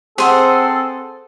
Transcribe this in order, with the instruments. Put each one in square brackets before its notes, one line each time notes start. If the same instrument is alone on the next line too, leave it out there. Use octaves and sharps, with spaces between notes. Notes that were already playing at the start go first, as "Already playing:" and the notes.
[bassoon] C4 [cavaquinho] G#4 C5 F#5 [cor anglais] A4